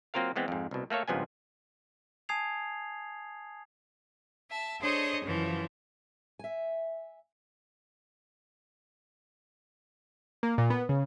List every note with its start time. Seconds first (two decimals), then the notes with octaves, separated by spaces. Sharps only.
0.14 F#3 A#3 C4 F4 A#4 F5
0.36 E3 G#3 B3 C4
0.48 F2 G#2
0.71 C2 B2
0.90 A3 A#3 A4 C#5 F5
1.08 G#1 C#2 G2 F3 B3 G#5
2.29 G#5 A5 D#6 G#6 C7 F7
4.50 E5 A5
4.81 D4 G#4 A4 C5 C#5 D#5
5.25 F#2 C#3 E3 F3
6.39 E5 G#5
10.43 A#3
10.58 A#2
10.70 B3
10.89 C#3